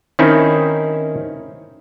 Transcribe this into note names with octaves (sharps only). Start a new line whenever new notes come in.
D#3 C4 C#4 D#4 E4